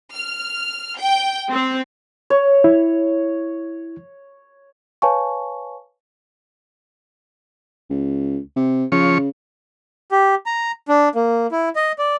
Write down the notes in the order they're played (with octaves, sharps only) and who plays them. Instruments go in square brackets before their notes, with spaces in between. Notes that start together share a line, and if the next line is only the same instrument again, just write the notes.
[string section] F6
G5
C4
[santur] C#5
[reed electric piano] E4
[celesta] B4 C#5 F5 G#5 A5 C#6
[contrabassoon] C#2
C3
[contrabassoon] C#3 [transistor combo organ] F3 C#5
[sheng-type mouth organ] G4
A#5
D4
A#3
E4
D#5
D5